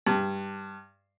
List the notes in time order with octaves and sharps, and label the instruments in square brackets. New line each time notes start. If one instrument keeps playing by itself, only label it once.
[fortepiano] G2